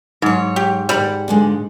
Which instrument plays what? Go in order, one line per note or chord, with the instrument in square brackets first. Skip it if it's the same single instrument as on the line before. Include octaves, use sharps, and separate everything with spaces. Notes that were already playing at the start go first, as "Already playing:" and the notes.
[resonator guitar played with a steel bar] G#2 [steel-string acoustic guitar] F#3 C#5
[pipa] G4
[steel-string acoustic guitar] D#2 C3 F#5 [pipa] G3 B5
[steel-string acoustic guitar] A#2 D3 G#3